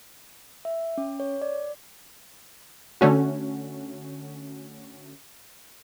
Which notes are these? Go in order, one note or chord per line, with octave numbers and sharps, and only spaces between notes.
E5
C#4
C#5
D5
D3 A3 C#4 F#4